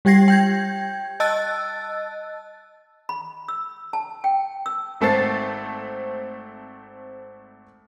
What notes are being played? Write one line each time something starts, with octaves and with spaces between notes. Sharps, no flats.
G3 G4 G5 G#6 A#6 C7
G5 G6 G#6
D#5 A5 E6 F#6 A6
B5
E6
A5
G5
E6
G#1 A3 C4 A4 A6 C7